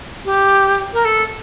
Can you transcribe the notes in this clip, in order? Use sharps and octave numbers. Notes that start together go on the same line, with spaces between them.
G4
A#4
A4